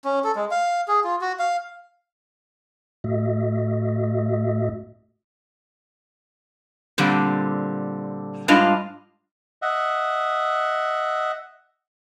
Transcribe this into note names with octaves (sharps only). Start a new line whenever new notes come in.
C#4
A4
G#3
F5
G#4
F4
F#4
F5
A2 A3 F#4 D#5 E5
A#2 D3 G3 C4
G#2 G3 D4 F4 D#5 F5
D#5 E5 F#5